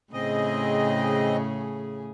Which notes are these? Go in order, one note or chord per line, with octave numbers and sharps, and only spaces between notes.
A2 C#3 C4 G#4 D#5